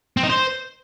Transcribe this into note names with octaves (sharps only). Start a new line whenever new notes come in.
C4
D#4
C5